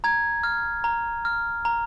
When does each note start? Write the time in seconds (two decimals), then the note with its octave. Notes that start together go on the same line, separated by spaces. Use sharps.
0.04 A#5 G#6
0.43 F6
0.84 A#5
1.25 F6
1.65 A#5